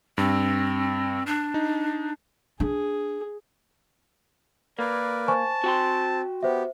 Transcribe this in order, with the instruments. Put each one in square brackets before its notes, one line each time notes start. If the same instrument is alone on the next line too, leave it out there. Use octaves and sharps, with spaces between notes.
[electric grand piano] G2 [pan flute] C4
[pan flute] D4
[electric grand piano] D#4
[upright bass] D4 [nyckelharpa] G#4
[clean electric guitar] A#3 [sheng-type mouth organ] A#4 B4 D5
[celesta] C5 G#5 C#6 [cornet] A5
[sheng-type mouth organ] C4 [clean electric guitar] F#4 G5 C6
[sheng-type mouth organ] B3 G4 [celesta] C5 E5